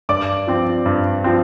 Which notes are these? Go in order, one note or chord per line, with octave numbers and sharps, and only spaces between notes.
G2 D5 D6
F3 C4
G2
F3 C4